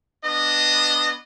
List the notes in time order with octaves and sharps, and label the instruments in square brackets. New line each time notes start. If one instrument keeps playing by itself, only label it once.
[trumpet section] B3 D4 D#5